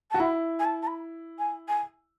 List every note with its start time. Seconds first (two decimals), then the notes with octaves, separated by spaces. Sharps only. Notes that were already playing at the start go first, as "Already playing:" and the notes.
0.11 F#4 A5
0.20 E4 B5
0.59 G#5
0.65 A5
0.82 A5
0.87 B5
1.39 G#5
1.68 G#5